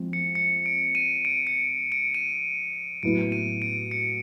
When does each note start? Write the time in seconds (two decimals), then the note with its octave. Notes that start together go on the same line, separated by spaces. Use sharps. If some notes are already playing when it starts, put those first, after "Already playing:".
Already playing: F3 G#3 C4
0.13 C#7
0.35 C#7
0.66 D7
0.95 D#7
1.25 D7
1.47 C#7
1.92 D7
2.15 D#7
3.03 A2 F#3 B3 E4 D7
3.32 D#7
3.62 D7
3.91 C#7